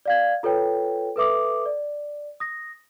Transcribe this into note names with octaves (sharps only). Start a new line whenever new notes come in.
D5 F5 G#6
F4 A4 B4 C#5 G5
A4 B4 E5 D6 D#6
D5
D#6 A#6